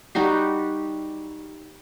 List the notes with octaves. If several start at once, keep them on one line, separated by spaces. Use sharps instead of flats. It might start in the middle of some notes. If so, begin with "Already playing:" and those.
G3 D#4 F#4 G4